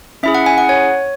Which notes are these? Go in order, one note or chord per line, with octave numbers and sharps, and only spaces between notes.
C#4 E4 G#4 E5
F#5
G#5
F#5
C#5